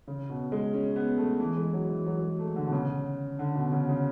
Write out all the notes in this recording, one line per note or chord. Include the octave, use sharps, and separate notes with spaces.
C#3
B2
G#3
C#4
B3
A3
E3
G#3
F#3
E3
F#3
G#3
A3
D3
B2
C#3
D3
B2
C#3
C#3